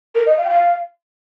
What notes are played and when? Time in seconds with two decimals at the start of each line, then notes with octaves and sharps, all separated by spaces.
0.15 A#4
0.26 D#5
0.38 F5
0.45 G5
0.49 F5